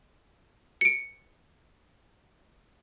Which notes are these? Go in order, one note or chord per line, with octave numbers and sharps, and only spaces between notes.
C#7 D7